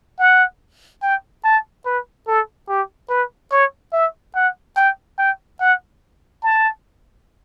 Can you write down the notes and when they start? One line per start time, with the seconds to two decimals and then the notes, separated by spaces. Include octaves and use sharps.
0.19 F#5
1.02 G5
1.44 A5
1.86 B4
2.28 A4
2.69 G4
3.10 B4
3.52 C#5
3.93 E5
4.35 F#5
4.77 G5
5.18 G5
5.60 F#5
6.43 A5